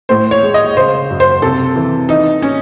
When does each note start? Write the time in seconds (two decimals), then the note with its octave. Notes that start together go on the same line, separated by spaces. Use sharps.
0.09 A2 C5
0.31 C#5
0.43 G#3
0.54 D#5
0.77 C#3 C5
1.10 F#2
1.20 C5
1.42 C3 A4
1.76 E3
2.09 E3 D#4
2.42 C#4